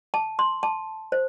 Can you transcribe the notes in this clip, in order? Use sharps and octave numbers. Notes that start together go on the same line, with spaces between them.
A5
C6
A5
C5